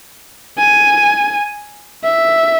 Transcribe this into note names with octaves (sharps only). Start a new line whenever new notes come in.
G#5
E5